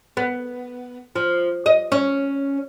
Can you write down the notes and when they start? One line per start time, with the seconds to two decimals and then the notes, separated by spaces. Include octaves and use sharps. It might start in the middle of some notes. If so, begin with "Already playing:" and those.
0.17 B3
1.16 F3
1.66 D#5
1.92 C#4